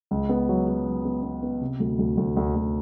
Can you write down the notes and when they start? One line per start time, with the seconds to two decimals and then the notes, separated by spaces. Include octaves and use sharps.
0.11 C#2
0.29 B3
0.49 F#3
0.68 F#3
0.86 F#3
1.05 B3
1.23 B3
1.43 B3
1.61 C3
1.80 D2
1.99 D2
2.17 D2
2.37 D2
2.55 D2